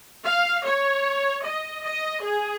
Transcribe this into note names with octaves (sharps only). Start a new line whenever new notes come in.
F5
C#5
D#5
D#5
G#4